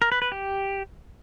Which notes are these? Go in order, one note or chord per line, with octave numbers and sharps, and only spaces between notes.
A#4
B4
B4
G4